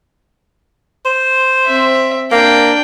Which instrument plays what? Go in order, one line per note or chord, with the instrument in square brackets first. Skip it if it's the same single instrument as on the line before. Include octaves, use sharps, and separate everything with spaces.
[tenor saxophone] C5
[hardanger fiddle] C4 E5
[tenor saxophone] A#3 [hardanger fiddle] D4 G5